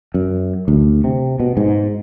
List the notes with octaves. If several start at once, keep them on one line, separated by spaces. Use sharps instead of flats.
F#2
D2
C3
B2
G#2